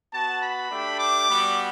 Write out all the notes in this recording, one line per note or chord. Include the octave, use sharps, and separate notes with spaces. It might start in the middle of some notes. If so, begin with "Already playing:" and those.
B3 F#4 A5
B5
A3 D4 G4
D6
G3 B3 F#4